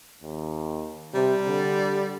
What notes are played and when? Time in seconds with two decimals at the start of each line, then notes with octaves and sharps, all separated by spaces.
0.23 D#2
1.14 C3 G3
1.47 D3